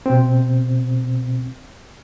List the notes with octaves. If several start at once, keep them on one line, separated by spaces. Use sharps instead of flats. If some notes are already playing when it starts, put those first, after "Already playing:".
B2 C4